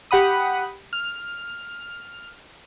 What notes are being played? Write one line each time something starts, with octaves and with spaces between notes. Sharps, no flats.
G4 F#5 B5 D#6
F6